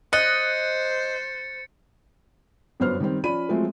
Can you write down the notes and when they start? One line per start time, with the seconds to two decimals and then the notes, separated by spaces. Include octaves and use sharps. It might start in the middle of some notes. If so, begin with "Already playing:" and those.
0.13 C5 D#5 F#6 A6 C#7
2.80 G1 F#2 B3 C5 F6
3.00 D#3 G3 C4
3.24 F3 C#4 D5 B5 D#7
3.49 F3 F#3 G#3 A3 C4